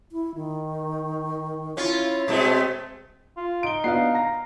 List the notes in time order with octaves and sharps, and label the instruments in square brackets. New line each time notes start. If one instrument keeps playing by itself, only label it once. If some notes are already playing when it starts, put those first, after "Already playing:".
[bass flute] E4
D#3
[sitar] C#4 F4 [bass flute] E4
[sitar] B2 G#3 A3 [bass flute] C4
[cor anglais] F4
[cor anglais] D#4 [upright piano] D7 G7
[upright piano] B3 D4 F#4 [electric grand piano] F5 C7
[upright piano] A#5 A#6